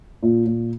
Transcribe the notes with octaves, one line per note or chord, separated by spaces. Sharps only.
A#2
A#2